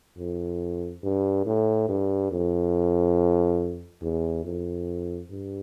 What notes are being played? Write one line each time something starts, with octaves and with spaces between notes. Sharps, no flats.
F2
G2
A2
G2
F2
E2
F2
G2